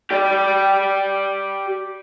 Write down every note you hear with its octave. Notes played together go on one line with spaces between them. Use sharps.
G4 D5